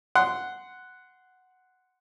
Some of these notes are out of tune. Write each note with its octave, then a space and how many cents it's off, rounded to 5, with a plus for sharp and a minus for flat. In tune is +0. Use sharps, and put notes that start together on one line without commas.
F#5 +0 C6 -15